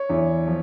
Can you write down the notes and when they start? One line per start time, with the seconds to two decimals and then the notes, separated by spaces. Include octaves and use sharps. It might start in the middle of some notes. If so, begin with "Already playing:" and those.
Already playing: C#5
0.10 E2
0.47 F3